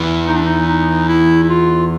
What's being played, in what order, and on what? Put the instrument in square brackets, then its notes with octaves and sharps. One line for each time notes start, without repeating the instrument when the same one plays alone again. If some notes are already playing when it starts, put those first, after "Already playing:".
Already playing: [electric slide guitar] E2 E3
[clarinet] D#4
D4
D#4
D#4
E4
E4
F4